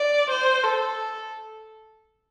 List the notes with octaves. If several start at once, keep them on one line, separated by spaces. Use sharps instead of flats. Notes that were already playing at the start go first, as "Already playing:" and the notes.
Already playing: D5
C5
A4